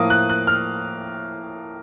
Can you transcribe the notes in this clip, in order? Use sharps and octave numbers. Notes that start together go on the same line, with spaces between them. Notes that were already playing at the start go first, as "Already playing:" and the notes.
Already playing: A2 F3 A#3 D#6
F#6
F#6
F6